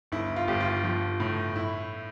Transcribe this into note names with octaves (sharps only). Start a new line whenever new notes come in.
G1 E4
F4
G1 G4
F4
F3
A2
E4